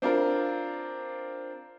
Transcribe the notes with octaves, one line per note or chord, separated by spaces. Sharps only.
C4 D4 F4 A#4